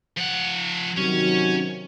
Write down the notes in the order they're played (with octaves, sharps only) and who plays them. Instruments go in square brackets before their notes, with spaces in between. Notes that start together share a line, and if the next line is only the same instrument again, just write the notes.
[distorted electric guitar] F3 F#5
[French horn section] C3 D#3 F#3 [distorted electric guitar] C#4